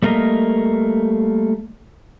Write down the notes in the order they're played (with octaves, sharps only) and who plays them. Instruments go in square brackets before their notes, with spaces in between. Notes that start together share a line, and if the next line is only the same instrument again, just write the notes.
[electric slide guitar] G3 A3 A#3 A#4 D#5